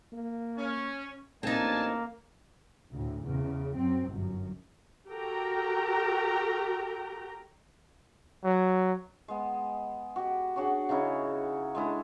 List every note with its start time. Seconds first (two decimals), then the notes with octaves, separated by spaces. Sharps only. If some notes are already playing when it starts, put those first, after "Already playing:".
0.12 A#3
0.58 C#4
1.43 A1 A#3 C4 D4 D#4 G#5 A5
2.92 D2 A2
3.27 E2 C#3
3.78 F#2 C4
4.10 G1 F#2
5.10 F#4 G4 A4 A#4 G5 A#5
8.44 F#3
9.28 G#3 B3
10.16 F#4 G4
10.56 D4 F#4 G#4 C#5
10.89 C#3 D#4 E4 C#5
11.75 G#3 D4 E4 A4